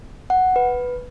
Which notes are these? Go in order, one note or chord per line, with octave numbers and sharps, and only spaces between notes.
F#5
B4